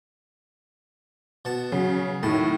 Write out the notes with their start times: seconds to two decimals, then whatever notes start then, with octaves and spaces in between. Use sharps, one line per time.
1.45 B2 F#5 A5
1.72 C#3 F#3
2.23 A2 D#3 A5